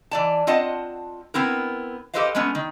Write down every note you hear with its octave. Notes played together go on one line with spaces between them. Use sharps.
E3 D5 A5
C4 F4 D#5 F#5 A5
B3 C4 E4 A#4
G4 A4 B4 C5 D#5 F5
G#3 A3 B3 C#4
D#3